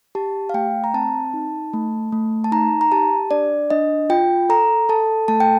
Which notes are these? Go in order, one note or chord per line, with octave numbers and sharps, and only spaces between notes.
G4 A5
F5
A3 G5
A#5
C4 A5
D#4
A3
A3
A5
D#4 A#5
A#5
G4 A5
D4 D5
D4 D#5
F4 G5
A4 A#5
A4 A5
A3 A5
G5